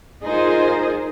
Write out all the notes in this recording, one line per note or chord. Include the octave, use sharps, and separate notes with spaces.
D#4 F4 G#4 A#4 C5 D#5